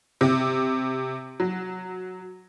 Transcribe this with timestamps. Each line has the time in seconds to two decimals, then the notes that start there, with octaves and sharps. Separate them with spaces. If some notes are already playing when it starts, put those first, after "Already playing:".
0.21 C3
1.40 F#3